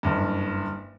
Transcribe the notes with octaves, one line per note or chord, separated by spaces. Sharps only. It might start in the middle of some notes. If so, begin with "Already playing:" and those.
F#1 G2